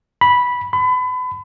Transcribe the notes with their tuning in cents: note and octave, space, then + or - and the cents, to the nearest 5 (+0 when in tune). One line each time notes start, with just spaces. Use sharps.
B5 -10
B5 +30